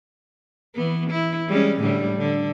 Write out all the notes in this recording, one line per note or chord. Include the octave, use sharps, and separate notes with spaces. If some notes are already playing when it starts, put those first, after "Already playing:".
E3 B3
E4
G3 G#3 C#4
A2 D3 G3
D3